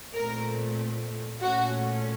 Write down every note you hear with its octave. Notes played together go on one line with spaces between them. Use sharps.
A#2 A3 C4 A#4
A#2 A3 C#4 F#4